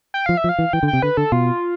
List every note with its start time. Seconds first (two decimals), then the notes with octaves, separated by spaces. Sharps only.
0.14 G5
0.26 F3 F5
0.37 E5
0.44 F3
0.49 F5
0.59 E3
0.73 E3 G5
0.83 D3
0.88 G5
0.93 C3
1.02 D3 B4
1.17 D3 A4
1.32 B2 F4